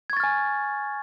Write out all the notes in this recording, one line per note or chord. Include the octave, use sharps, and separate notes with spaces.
G#5 C#6 F6 G#6 A6